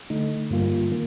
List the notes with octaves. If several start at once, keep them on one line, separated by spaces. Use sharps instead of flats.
D3 A3 D#4
G2 D3 G3 A#3 F4
D#3 A#3